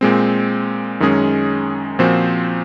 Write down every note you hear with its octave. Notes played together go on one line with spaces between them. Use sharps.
A#2 G#3 C4
F#2 D#3 G#3 C#4 G#4
A#2 F3 C4 F#4 C5